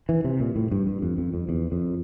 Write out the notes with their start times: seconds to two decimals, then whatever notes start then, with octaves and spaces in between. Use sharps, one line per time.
0.09 E3
0.24 C3
0.40 A#2
0.56 A2
0.71 G2
0.87 G2
1.02 F2
1.18 F2
1.34 F2
1.49 E2
1.72 F2